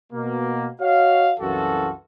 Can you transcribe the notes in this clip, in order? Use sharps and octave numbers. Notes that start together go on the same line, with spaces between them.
B2 A#3
F#4 C#5 D#5 F5
C2 F#2 E3 F4 F#4 A4